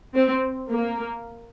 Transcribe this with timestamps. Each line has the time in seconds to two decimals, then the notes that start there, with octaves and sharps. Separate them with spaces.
0.15 C4
0.70 A#3